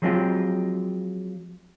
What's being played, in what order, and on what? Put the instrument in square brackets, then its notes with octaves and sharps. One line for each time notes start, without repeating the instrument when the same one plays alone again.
[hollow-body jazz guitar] F3 F#3 G#3 C4 F4 G4